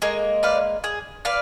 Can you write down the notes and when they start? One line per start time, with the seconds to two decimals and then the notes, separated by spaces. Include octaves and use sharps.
0.02 G#3 A#3 G#4
0.43 B4 D5 F5
0.84 G#4
1.25 B4 D5 F5